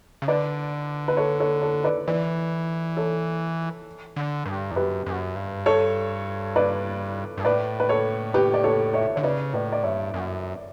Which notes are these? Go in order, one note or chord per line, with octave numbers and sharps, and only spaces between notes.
C#3
D3 B4 D5
B4
A4 C#5
A4 C#5
A4 C#5
B4 D5
E3 B4 D5
A4 C#5
D3
G2
E2
F#2 G4 B4
F#2
G2
A4 C#5
B4 D5
G2
A2 B4 D5
B4
A4 C#5
G4 B4
D5
A4 C#5
C#5 E5
D3 C#5
C#3 B4 D5
A2 B4 D5
D5
G2 C#5 E5
F#2